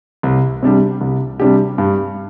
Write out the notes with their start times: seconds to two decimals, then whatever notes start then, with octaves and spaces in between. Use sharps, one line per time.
0.23 C2
0.63 C3 G3 D4 G4
1.01 C2
1.40 C3 G3 D4 G4
1.78 G2